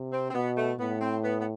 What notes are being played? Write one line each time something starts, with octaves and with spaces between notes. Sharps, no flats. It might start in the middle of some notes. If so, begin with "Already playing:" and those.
Already playing: C3
C4
C4
B2 B3
A3
A2 B3
C4
B3
B3